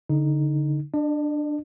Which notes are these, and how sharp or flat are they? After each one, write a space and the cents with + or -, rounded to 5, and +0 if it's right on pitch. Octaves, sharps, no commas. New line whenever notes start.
D3 -20 D#4 +0
D4 +10 D#5 -45